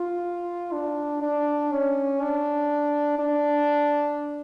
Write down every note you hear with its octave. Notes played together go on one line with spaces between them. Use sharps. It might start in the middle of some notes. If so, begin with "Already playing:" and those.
Already playing: F4
D4
D4
C#4
D4
D4